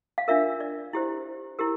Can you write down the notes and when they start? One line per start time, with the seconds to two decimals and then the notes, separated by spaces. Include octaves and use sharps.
0.18 F5
0.28 D4 F4 A#4 E5
0.60 D5
0.93 E4 G4 C5
1.59 E4 G4 A#4